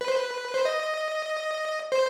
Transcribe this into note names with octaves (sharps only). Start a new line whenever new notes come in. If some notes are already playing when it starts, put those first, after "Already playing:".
B4
C5
B4
C5
D#5
C5